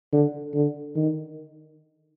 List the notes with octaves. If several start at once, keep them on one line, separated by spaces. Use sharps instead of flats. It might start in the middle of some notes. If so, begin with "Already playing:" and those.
D3
D3
D#3